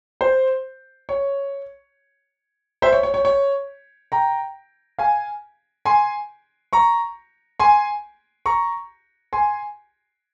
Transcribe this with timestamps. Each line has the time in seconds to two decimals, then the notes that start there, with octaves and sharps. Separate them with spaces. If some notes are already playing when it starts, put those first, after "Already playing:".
0.21 C5
1.09 C#5
2.82 C5 E5
2.93 C#5
3.03 C#5
3.14 C#5
3.25 C#5
4.12 G5 A#5
4.99 F5 G#5
5.85 G#5 C6
6.73 A#5 C#6
7.60 G#5 C6
8.46 A#5 C#6
9.33 G#5 C6